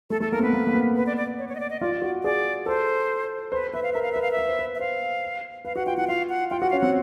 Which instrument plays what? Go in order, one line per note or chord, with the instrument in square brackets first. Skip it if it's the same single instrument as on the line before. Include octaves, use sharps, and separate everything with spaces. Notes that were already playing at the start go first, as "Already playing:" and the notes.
[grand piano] A3 [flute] A4
[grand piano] A3 [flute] A4
[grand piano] A#3 [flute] A#4
[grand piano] C4
[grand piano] B3 [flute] B4
[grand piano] A#3
A#3
B3
[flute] B4
D5
D5
C#5
C#5
D#5
D5
D#5
[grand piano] F4 [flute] D5
[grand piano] F#4
[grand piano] G#4 [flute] D5
[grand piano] A4 [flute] C5
[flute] B4 [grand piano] C5
[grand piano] B4 [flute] E5
[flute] F5
[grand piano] A#4 [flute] E5
[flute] F5
[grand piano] B4 [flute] E5
[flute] F5
E5
[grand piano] B4
C5
B4
[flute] E5
[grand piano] C5 [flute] F5
[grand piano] B4 [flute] F5
[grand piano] F#4 [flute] F#5
[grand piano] F4 [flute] G5
[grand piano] E4 [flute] F#5
[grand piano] F4 [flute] F5
[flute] F#5
[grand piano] F4 [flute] G5
[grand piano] F#4 [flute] F#5
[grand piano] C#4 [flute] F5
[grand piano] C4 [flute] F#5